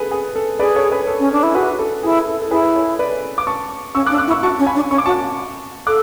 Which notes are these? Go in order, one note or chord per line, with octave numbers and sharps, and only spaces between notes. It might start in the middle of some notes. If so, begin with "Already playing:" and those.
Already playing: G#4 A4 B4
G#4
A4
G#4 B4 D5
A4 C#5
G#4 B4
A4
C#4
D4
E4
F#4 G#4 B4
A4
E4 G#4
A4
A4
E4 G#4 B4
A4 C#5
B4 D5
D6
A5 C#6
C#4 C#6 E6
D6 F#6
D4
E6
D6 F#6
E4
C#6 E6
F#4 A5 C#6
C#4
G#5 B5
D4
C#4 C#6
D6
F#4 A5 C#6
A4 D6 F#6